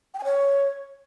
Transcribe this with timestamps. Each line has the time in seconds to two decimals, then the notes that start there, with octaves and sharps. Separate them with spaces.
0.14 G5
0.19 G#5
0.24 C#5